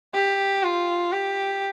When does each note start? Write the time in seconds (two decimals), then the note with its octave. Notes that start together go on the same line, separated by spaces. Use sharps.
0.14 G4
0.63 F4
1.12 G4